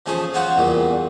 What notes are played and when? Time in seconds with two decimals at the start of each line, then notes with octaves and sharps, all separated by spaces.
0.06 F3 A3 C#4 G#4 C5
0.34 C#4 F4 F#4 C5 C#5
0.55 E2 A#2 G3